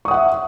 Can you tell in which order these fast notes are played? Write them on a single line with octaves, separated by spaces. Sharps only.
C#6 D#6 F#5 E5